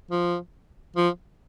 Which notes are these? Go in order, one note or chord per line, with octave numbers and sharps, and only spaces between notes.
F3
F3